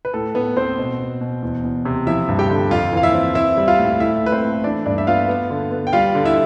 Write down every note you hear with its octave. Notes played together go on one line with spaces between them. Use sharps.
B4
A2 A4
A2 B3 B4
B3 C4 C5
B2
B2
B2
E2
E2
C3
F3 E4 E5
G2
G4 G5
D3
F2 F4 F5
E3 F5
E4 E5
C4
C4 E4 E5
G3
F4 F5
A2
A3 E4 E5
A2 B4
C4 C5
A3
E3 D4 D5
G2 D4 D5
E5
B3 F4 F5
B3
D3
B3
G5
G3 F4 F5
D3
E4 E5